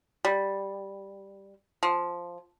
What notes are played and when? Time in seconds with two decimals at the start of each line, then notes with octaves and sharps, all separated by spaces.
0.25 G3
1.83 F3